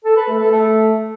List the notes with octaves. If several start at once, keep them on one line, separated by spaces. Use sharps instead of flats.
A4
B4
A3
A4
A3